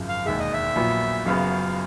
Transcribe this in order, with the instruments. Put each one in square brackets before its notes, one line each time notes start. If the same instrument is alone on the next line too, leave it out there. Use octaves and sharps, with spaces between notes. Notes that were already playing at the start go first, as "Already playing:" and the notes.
Already playing: [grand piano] G#1 F#2 C#3 F3
[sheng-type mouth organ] F5
[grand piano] E1 D#2 D#3 G#3 [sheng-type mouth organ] E5
[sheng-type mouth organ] D#5
E5
[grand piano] A#1 A#2 F#3 B3
[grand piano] F#1 F#2 C#3 F#3 B3 [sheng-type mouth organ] F5